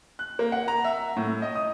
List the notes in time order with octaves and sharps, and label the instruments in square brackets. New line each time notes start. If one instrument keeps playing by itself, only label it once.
[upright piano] F#6
A#3
F#5
A#5
E5
A2
D#5
D#6